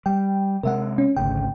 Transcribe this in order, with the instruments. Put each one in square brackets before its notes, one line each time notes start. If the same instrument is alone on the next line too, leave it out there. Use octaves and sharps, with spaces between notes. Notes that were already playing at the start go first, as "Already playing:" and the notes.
[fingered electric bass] G3 [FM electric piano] G5
[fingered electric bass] C3 G#3 [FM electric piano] A#4 E5 F#5
[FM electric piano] C#4
[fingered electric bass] G#1 D2 C#3 [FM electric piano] G5